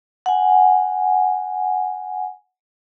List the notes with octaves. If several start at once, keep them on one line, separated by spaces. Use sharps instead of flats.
F#5 G#5